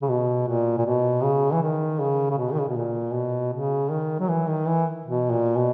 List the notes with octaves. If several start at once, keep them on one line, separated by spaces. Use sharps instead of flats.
C#3
B2
A#2
A#2
B2
C#3
E3
D#3
C#3
C#3
B2
D#3
C#3
B2
A#2
B2
C#3
D#3
F#3
E3
D#3
E3
B2
A#2
B2